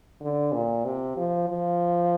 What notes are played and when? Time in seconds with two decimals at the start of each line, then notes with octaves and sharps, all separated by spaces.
0.21 D3
0.53 A#2
0.84 C3
1.16 F3
1.48 F3